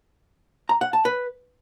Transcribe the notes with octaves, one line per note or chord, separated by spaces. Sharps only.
A#5
F#5
A5
B4